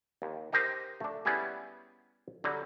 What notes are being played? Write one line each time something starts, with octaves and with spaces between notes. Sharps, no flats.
D#2
D#4 G4 A#4 C5 D#5
A3 D4
G3 B3 C#4 E4 G4 G#4
D3 F#3 G3